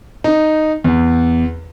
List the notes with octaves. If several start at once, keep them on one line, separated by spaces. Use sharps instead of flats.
D#4
E2